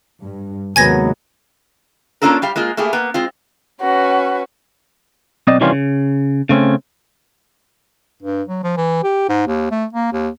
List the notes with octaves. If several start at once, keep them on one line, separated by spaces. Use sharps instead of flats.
G2
D#2 C3 F#3 G#3 B3 G#5 G#6 A#6
A#3 C#4 D4 F4 A4 A#4
G3 G4 F5
G#3 A#3 F4 G#4
A3 A#3 E4 G4 G#4
A#3 B3
G#3 C4 F4
C#4 F#4 B4
B1 C4 D5 D#5
C3 D#3 E3 G3 C#4 F4
C#3
C#3 A3 C4 C#4
G2
F#3
F3
E3
G4
G#2
D#2
A3
A#3
D#2